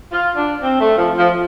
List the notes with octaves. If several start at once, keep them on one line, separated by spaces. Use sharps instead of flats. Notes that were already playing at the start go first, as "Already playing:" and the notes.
F4
D4
C4
A3
F3
F3